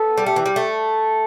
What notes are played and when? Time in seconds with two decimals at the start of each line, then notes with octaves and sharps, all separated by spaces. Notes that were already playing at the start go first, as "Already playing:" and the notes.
Already playing: B3 A4
0.18 G3
0.26 A3 G4
0.36 E3
0.46 G3
0.56 A3